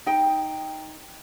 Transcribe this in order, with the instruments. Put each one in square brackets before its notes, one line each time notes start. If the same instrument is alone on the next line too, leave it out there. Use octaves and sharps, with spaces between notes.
[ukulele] D#4 G5